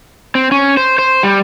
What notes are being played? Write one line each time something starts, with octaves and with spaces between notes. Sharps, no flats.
C4
C#4
C5
C5
G3